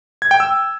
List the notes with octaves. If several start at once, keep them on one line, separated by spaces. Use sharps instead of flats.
G#6
G5
E6